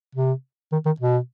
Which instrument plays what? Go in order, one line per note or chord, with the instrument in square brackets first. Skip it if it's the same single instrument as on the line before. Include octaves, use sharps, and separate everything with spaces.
[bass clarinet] C3
D#3
D#3
B2